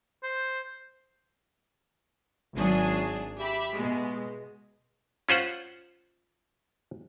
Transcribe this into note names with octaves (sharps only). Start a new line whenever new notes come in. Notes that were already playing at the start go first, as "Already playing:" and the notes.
C5
G#1 F#3 D4 G#4
G4 E5 B5 D6
B2 G#3
C#4 F4 C5 F#5